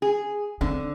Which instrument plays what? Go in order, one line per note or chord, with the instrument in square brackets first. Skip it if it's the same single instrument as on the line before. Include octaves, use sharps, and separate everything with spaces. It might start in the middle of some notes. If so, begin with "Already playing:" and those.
[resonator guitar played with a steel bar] G#4
[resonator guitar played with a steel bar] D3 [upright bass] C4